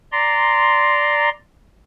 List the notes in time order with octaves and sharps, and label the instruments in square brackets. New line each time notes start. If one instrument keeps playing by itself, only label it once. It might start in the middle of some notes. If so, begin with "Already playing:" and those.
[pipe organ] D5 A#5 C6